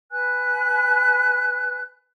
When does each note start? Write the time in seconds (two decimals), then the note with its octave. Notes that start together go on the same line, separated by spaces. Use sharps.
0.11 B4 G#5 F#6